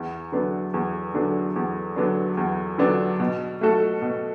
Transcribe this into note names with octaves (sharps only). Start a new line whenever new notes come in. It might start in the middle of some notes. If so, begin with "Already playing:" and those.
Already playing: E2
D3 F#3 B3 D4
E2
D3 F#3 B3 D4
E2
D3 F#3 B3 D4
E2
D3 F#3 B3 D4
B2
A3 F#4 A4
B2